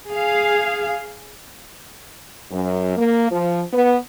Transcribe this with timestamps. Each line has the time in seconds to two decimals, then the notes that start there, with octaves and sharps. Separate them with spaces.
0.12 G#4 F5
2.50 F#2
2.97 A#3
3.31 F3
3.73 B3